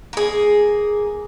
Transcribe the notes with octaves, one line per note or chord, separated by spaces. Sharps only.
A#3 G#4